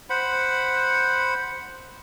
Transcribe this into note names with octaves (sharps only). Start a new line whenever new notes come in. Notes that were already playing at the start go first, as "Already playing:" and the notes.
C5 F#5 B5